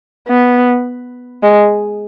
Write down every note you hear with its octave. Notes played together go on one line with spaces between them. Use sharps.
B3
G#3